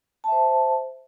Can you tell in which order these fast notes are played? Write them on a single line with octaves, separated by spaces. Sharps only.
A5 E5 C5